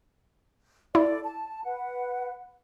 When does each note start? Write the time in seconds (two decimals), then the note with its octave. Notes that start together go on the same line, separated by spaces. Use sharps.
0.95 E4 A4 D5
1.24 A5
1.64 B4 F#5